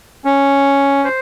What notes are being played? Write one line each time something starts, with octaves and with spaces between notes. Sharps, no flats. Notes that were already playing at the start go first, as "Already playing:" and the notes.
C#4
C5